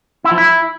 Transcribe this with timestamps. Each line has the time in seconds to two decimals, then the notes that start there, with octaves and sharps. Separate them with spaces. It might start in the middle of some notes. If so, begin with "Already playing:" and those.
0.24 E4
0.31 F3
0.38 E4